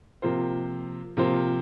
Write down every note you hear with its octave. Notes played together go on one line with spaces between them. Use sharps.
C3 F3 A#3 F4 C5
C3 F3 A#3 F4 C5